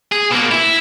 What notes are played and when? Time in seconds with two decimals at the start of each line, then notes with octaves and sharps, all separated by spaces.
0.12 G#4
0.31 B2 A#3
0.51 E4